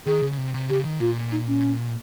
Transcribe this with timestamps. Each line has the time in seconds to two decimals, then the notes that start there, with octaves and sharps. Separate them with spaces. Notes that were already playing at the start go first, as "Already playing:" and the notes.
0.06 D#3 G#4
0.22 C#3
0.32 C#3
0.37 C3
0.54 C3
0.69 C#3 G4
0.85 D#3
1.00 A#2 F4
1.32 D#4
1.48 C#4